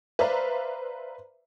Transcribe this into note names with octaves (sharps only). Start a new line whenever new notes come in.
B4 C5 D5 E5 F5 A#5